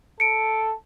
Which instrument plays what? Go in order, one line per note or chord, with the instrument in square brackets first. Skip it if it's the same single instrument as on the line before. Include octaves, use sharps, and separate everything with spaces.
[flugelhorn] A4 [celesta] C#7 D7